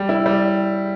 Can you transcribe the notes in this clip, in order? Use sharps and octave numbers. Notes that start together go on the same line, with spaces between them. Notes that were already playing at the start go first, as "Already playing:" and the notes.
Already playing: G3
E4
G3